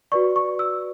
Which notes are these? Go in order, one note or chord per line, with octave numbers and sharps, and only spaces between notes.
F#4 B4 D5 C#6
C#6
E6